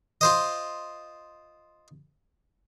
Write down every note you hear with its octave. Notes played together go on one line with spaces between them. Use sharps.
F4 C5 D#5